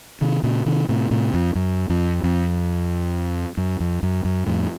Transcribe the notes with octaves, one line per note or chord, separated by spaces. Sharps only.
C3 D#3
A#2 C#3
C3 D#3
A2 C3
A2 C3
F2
F#2
F2
F2
F#2
F2
F#2
F#2
F2 A2